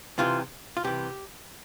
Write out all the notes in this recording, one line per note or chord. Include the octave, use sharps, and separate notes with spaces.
C2 C3 E3 F4
F4
C2 C3 E3 G4